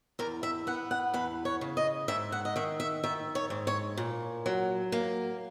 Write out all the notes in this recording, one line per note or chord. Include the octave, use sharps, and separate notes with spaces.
E2 A#4
E5
B3 F#5
F#5
E2 B4
C#5
C#3
D#5
G#2 E5
F#5
D#5
D#3 E5
E5
D#3 E5
C#5
G#2
C#5
A#2
F#3
A#3